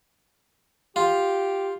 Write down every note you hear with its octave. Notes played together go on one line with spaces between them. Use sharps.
F4 G4